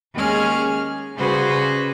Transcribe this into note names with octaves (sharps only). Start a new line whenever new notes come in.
D#2 G#3 C#4 G#4 F6
C#3 G3 F#4 G#4 B4 C5